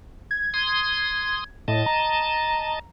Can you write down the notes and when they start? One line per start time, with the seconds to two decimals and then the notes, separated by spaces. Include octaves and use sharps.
0.31 G#6
0.54 C6 D#6
1.68 A2 D#5 A5
1.86 A#5